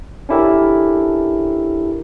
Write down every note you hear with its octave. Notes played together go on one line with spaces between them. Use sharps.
C#4 D4 E4 G4 A4 A#4